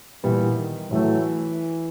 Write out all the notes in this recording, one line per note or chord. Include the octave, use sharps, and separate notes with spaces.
A#2 E3 G3 B3
D#3
A2 E3 F#3 A3